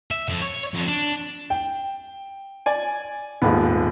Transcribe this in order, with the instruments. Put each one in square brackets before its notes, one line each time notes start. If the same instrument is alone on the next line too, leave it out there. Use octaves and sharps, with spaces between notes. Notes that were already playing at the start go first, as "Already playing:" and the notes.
[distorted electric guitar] E5
F2
C#5
F2
D4
[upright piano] G5
[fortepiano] D5 G#5
[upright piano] D#1 D#2 G#2 [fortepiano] B3